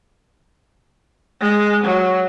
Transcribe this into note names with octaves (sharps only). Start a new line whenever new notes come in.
G#3
F#3